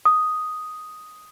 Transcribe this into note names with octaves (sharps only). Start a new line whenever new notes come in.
D#6